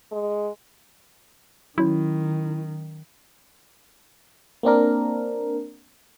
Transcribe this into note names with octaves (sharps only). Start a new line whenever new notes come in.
G#3
D#3 F#3 C#4 E4
A#3 C4 D4 A#4